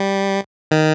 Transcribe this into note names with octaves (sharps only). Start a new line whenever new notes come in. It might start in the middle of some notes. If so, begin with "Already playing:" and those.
Already playing: G3
D#3